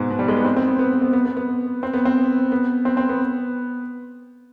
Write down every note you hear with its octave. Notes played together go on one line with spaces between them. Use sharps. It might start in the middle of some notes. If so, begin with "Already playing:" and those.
Already playing: G#2 B2
B2
G3
G#3
B3
C4
C4
B3
B3
B3
B3
B3
B3
C4
B3
C4
B3
C4
C4
B3